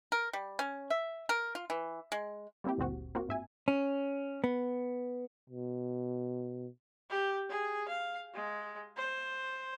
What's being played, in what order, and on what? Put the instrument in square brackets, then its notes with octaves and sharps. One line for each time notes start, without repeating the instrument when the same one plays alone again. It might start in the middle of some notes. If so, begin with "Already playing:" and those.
[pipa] A#4
G3
C#4
E5
A#4
F4
E3
G#3
[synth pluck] G3 A#3 C4 E4 G4
G1 D2 A#2 C4 F#4
A#3 C4 F4 F#4
G#2 E5 G#5
[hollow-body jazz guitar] C#4
B3
[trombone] B2
[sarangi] G4
G#4
F5
G#3
C5